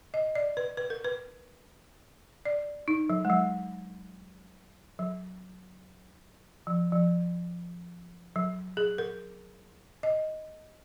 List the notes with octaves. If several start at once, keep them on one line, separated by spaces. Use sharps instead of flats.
D#5
D5
B4
B4
A#4
B4
D5
D#4
F#3
G#3
F#3
F#3
F3
F3
F#3
G#4
A#4
D#5